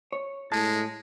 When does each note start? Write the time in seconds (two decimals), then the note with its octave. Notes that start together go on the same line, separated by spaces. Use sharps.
0.12 C#5
0.52 A2 G#3 A5